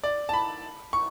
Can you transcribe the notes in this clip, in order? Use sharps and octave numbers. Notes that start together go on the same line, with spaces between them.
D5
A5
B5
C#6